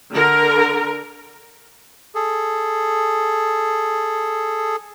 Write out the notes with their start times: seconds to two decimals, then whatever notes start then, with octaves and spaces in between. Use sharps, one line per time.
0.13 D3 A#4
2.15 G#4 A4